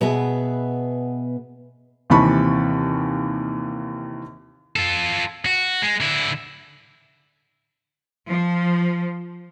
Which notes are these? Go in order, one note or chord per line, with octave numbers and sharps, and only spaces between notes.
B2 B3 G#4 B4 E5
D#2 C3 E3 A5 B5 C#6
F4 A4
F#4
G#3
D3 E4
F3